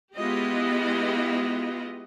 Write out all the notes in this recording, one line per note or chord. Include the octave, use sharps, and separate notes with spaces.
G#3 B3 E4 F4 G4 D#5